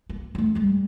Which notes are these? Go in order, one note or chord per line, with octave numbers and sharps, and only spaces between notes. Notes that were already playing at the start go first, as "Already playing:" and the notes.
A#3
A3 B3
G3 G#3